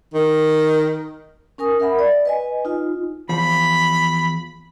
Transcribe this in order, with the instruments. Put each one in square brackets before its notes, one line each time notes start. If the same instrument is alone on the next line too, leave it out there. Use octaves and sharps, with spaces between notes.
[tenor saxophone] D#3
[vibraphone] C#4 A#4 G#5 D#6
A#4 E5 F#5 B5
D5
B4 D#5 G#5
D#4 F4
[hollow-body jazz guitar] E2 F3 [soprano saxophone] B5